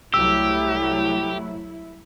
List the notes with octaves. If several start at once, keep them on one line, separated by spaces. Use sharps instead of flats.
C2 F#3 A3 E4 G4 E6